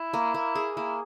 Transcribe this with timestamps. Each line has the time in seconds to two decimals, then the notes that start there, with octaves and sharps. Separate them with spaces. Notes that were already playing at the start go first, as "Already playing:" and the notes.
Already playing: E4
0.14 A#3
0.34 A#3
0.55 G#4
0.76 A#3 E4